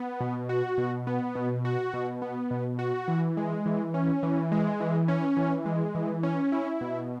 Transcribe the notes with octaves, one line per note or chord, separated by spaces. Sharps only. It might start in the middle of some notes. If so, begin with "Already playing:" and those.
Already playing: B3
B2
F#4
B2
B3
B2
F#4
B2
B3
B2
F#4
E3
G#3
E3
C#4
E3
G#3
E3
C#4
E3
G#3
E3
C#4
E4
B2